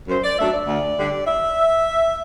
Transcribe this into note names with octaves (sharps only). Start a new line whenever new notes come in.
F#2 C5
D5
F#3 A3 D4 E5
D5
D2
D3 G3 D4
E5